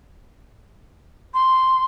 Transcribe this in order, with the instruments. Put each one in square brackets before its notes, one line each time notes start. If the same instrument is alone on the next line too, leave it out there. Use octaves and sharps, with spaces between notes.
[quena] C6